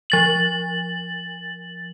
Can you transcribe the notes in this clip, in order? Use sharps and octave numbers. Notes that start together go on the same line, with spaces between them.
F3 A6 F#7